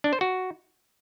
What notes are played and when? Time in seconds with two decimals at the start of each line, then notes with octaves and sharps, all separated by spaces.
0.04 D4
0.13 C5
0.21 F#4